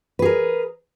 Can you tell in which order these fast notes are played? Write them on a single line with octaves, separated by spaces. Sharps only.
B4 G#4 A#4